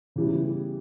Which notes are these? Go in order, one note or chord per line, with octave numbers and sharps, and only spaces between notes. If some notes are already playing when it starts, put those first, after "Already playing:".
C#3 E3 G3